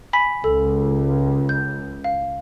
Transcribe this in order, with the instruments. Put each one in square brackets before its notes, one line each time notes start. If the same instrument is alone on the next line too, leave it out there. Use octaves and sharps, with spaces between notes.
[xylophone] G#5 B5 B6
[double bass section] C#2 [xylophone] A4
[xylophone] G6
F5